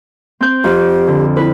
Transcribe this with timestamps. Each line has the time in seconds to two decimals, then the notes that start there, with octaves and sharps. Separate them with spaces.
0.41 C4 G6
0.64 F2 G4
1.08 D3
1.37 E4 B4